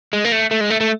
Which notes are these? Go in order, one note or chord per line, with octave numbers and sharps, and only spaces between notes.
G#3
A#3
A3
A3
G#3
A3
A3